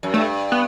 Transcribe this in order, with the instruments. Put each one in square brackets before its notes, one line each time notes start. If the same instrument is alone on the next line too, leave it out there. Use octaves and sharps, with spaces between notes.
[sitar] F#2
[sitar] G2 [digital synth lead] A3
[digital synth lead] B3